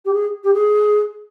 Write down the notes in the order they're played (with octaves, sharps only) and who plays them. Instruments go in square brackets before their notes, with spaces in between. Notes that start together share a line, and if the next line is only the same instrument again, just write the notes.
[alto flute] G4
G#4
G4
G#4